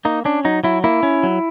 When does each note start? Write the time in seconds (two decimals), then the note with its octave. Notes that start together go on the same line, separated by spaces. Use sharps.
0.05 A#3 D#4
0.25 C#4 D4
0.45 F#3 D#4
0.64 F#3 E4
0.84 A#3 E4
1.03 C#4
1.23 F#3